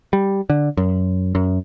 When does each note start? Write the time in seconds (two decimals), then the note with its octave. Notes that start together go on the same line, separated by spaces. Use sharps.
0.13 G3
0.50 D3
0.77 F#2
1.35 F#2